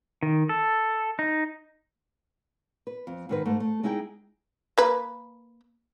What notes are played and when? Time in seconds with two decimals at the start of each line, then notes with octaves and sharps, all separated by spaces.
0.23 D#3
0.49 A4
1.19 D#4
2.87 B4
3.07 F2
3.29 G#2 D#3 B4
3.46 G#2 A3
3.60 A3
3.83 G#3 D#4 E4 G#4 G5
4.78 A#3 B4